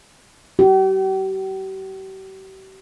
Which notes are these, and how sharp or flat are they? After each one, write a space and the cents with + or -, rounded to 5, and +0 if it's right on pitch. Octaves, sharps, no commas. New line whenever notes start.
G4 -40